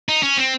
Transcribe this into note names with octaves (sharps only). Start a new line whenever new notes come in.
D#4
C#4
C4